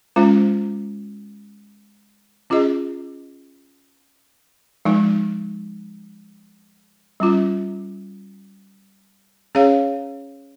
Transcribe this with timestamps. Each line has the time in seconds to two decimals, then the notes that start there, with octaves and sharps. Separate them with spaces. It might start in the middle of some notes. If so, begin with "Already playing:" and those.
0.16 G#3 C#4 F4 C5
2.50 C#4 F4 G#4 D#5
4.85 F3 G#3 D#4
7.20 G3 C#4 F4
9.55 C#4 G#4 C#5 F5